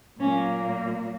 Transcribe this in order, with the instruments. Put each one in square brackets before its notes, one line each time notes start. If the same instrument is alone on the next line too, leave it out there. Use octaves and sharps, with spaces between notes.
[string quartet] A#2 F#3 A#3 C#4